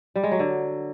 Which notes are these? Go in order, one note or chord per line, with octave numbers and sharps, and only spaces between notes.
G3
G#3
F#3
D3